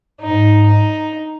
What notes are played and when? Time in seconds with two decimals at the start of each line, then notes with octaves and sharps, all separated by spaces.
0.21 G#2 D#4
0.66 D#4